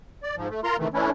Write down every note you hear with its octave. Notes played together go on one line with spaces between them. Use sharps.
D5
G#2 F3
A3
F4 A#4 A#5 C6
C3 D#3 E3 A3
E3 A3 C#4 D4 E4